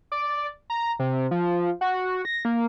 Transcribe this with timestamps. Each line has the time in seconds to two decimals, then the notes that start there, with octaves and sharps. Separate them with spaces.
0.12 D5
0.70 A#5
0.99 C3
1.31 F3
1.81 F#4
2.25 A#6
2.45 A#3